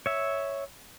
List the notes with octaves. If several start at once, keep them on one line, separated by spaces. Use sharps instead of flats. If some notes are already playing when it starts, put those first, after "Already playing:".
C#5 E5